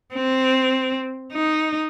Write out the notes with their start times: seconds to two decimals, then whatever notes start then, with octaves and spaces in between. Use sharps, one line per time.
0.15 C4
1.33 D#4